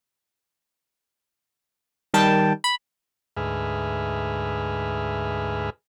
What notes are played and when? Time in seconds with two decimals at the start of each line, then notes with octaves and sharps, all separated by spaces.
2.14 D#3 G3 G5 A5
2.64 B5
3.37 D2 G#2 G#4 B4 E5 F6